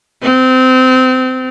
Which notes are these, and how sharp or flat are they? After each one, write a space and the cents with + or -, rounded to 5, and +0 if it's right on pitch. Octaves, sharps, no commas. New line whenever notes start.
C4 -25